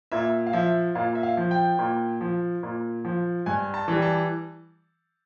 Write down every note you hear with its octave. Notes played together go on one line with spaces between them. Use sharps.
A#2 E5
F5
F3 E5
A#2 F5
E5
F5
F3
G5
A#2
F3
A#2
F3
G2 G#5
A5
E3 G3
A5